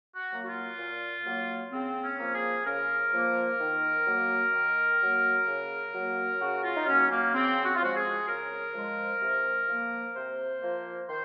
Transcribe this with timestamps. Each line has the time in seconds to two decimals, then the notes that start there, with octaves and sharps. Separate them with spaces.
0.16 F#4
0.31 F#3 A#3
0.43 F#4
0.47 F4
0.78 A#2
1.25 F#3 A#3
1.72 C#3 C4
2.03 C#4
2.19 F3 A#3
2.34 G#4
2.66 C#3 A#4
3.13 F3 A#3
3.60 D#3
4.07 F#3 A#3
4.53 D#3
5.00 F#3 A#3
5.47 C#3
5.93 F#3 A#3
6.40 C#3 F#4
6.64 F4
6.76 D#4
6.87 F#3 A#3 C#4
7.11 A#3
7.34 C#3 C4
7.65 F#4
7.75 F4
7.81 F3 G#3 F#4
7.96 G#4
8.28 C#3 A#4
8.74 F3 G#3
9.21 C3
9.68 F3 A#3
10.15 C3 C5
10.62 F3 A#3
11.09 D#3 C5